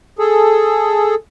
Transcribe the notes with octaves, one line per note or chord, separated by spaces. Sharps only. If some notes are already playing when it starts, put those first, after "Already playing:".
G#4 A4